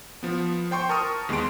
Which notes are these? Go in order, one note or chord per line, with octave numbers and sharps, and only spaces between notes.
F3 B3
C5 G5 C6 C#6
A#4 A5 C#6 D#6 F6
D#2 G#3 B3 C6 D7